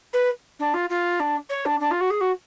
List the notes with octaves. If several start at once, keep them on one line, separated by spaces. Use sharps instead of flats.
B4
D4
F4
F4
D4
C#5
D4
D4
F4
F#4
G#4
F#4